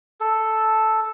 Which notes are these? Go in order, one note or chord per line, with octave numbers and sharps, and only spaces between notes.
A4